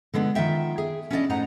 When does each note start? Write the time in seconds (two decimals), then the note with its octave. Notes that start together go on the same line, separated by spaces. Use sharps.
0.14 D3 G#3 B3 D4
0.35 D#3 B3 F4 E5 G5
0.78 G#4
1.11 C#4 D4 E4 G#4 D5 D#5
1.29 A2 D#4 C5 D#5 F#5 A#5